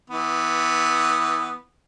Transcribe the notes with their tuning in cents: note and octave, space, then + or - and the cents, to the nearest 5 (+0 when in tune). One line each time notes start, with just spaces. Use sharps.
E3 -20 B3 +0